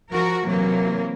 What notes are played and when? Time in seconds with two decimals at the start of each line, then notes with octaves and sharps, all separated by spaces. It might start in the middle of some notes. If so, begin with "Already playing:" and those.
0.12 F3 F#4 A#4
0.44 C3 E3 F#3 A#3